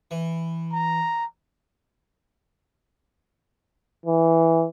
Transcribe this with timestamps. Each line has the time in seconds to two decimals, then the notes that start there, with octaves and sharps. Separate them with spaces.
0.11 E3
0.73 A#5
4.06 E3